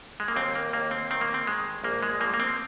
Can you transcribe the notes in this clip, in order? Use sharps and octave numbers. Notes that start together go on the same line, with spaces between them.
G#3
A#3
D#2 C4
A#3
D#2 A#3
C4
D#3 C4
A#3
C4
D#3 G#3
A#1 A#3
G#3
F3 A#3
A#3
C4